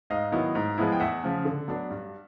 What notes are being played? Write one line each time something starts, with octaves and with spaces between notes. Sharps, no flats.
G#2 D#5 F5
D#3 F#3 B3 E4
G#2
F3 G#3 B3 E4
G5
E2 E5 F#5
C#3 F3
D3
F#3 B3 D4
G2